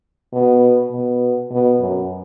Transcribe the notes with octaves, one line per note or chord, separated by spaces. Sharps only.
B2
B2
B2
F#2